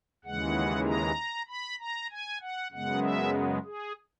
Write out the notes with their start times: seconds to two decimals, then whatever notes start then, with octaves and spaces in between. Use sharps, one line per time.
0.25 D#2 C#3 E3 G#3 F#5
0.87 A#5
1.48 B5
1.79 A#5
2.10 G#5
2.41 F#5
2.72 F#2 C#3 G#3 B3 F#5
3.03 E5
3.65 G#4